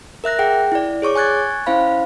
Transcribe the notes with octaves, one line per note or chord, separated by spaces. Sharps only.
A#4 E5 F#6 A#6
G#4 F#5 G5
E4 D5
G#4 C#5 C#6 D6
G#5 C#6 F#6 G#6 A6
C#4 E4 C5 F5 B5